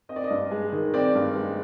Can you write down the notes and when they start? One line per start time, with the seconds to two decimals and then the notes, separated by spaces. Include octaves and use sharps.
0.09 C4 D#5
0.16 D5
0.24 D#5
0.30 G2
0.51 G#3
0.72 D#3
0.94 C4 D5
1.15 G2
1.36 G#3